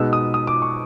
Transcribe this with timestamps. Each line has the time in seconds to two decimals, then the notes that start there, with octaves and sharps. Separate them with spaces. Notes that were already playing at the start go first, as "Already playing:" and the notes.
Already playing: B2 G#3 B3 D#4 E6
0.13 D#6
0.34 D#6
0.47 D6
0.62 C#6